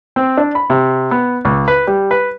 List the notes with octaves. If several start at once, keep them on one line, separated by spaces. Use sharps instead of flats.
C4
D4
B5
C3
B3
C#2
B4
G3
B4